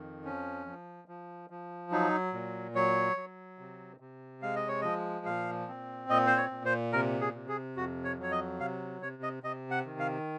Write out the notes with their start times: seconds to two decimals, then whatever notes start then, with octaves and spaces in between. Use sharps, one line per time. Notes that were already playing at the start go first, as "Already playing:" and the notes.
Already playing: F2 D#3
0.24 F3 C#4
0.67 F3
1.08 F3
1.50 F3
1.91 F#3 D#4
2.33 A#2
2.75 F#3 C#5
3.16 F#3
3.59 C3
4.00 C3
4.42 G#3 F5
4.56 D#5
4.68 C#5
4.81 F3 D#5
5.26 A#2 F5
5.67 C4
6.09 A#2 D#5
6.27 C5
6.37 C#5
6.51 A#2
6.65 C5
6.93 C3 A#4
7.21 G#4
7.34 C3
7.48 G#4
7.76 F2 F#4
8.04 C#5
8.18 F#3 C#5
8.32 D#5
8.60 C3 F5
9.02 C3 C#5
9.23 D#5
9.43 C3 D#5
9.71 F#5
9.85 D#3
9.99 F5